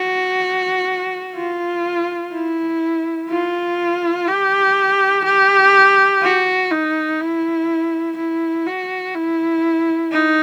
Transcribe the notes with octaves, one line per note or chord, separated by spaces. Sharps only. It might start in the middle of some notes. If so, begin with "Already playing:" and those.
Already playing: F#4
F4
E4
F4
G4
G4
F#4
D#4
E4
E4
F#4
E4
D#4